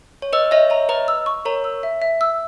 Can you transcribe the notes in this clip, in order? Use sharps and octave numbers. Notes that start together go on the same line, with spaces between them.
C#5
B4 D#5 E6
C#5 D#5 E5
C#5 E5 A#5
B4 D#5 A#5
E6
C#6
A#4 C#5 A#5
E6
E5
E5
E6